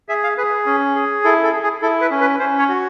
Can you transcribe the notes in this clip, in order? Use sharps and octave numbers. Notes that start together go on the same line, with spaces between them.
G#4 E5
F5
G#4 B4
C#4
G#4
E4 A4
A4
G#4
G#4
E4 A4
B4
C#4
B4
C#4 C5
C#5
F#4